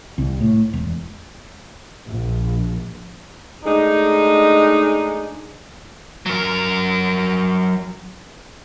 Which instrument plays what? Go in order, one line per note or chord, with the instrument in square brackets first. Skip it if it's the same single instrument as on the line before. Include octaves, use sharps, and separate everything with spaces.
[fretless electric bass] C2
A2
E1
[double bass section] A#1
[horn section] G#3 A3 D4 D#4
[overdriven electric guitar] F#3 A#4